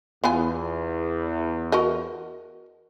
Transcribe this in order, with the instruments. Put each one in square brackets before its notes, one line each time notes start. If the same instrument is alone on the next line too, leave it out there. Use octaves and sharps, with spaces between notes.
[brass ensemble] E2 [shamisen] B3 F4 G#5
[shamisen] F#4 A#4 D#5